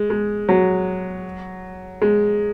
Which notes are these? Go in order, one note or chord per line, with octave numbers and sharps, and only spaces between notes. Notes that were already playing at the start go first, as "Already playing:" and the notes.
Already playing: G#3
G#3
F#3
G#3